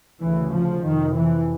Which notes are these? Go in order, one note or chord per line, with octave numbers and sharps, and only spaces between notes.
D2 C#3 E3
F3
F2 C3 D#3
E3